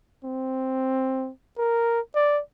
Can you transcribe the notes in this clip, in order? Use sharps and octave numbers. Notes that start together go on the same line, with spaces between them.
C4
A#4
D5